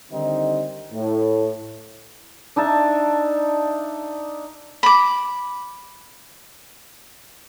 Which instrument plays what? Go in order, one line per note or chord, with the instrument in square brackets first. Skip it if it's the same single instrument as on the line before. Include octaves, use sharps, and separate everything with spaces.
[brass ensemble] D3 D#3 G3 C4 D#4
A2
[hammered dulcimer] D4 D#4 E5 A5
[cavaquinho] B5 D6